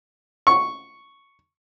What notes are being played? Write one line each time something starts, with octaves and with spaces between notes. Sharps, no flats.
C#6